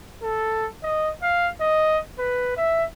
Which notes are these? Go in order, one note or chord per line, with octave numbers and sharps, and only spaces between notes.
A4
D#5
F5
D#5
B4
E5